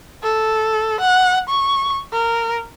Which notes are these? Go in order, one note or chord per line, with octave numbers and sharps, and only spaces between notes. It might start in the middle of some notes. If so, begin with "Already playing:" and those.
A4
F#5
C#6
A#4